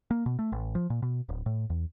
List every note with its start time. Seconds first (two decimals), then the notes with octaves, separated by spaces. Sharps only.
0.11 A#3
0.26 B2
0.39 A3
0.52 A1
0.75 F3
0.90 A#2
1.02 B2
1.29 D1
1.46 A2
1.70 E2